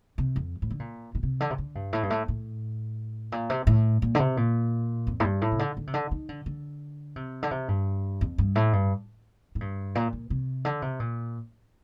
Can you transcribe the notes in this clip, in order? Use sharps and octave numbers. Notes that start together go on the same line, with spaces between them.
C3
F2
A2
D3
A#2
A#2
C3
D3
C3
D3
G2
A2
G2
A2
A2
A#2
C3
A2
A#2
D3
C3
A#2
F2
A2
G2
A2
C3
D3
D3
C3
D3
D#3
D3
D3
C3
D3
C3
G2
F2
G2
A2
G2
A2
G2
A#2
A#2
C3
D3
C3
A#2